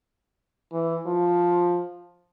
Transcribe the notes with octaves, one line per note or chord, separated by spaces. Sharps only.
E3
F3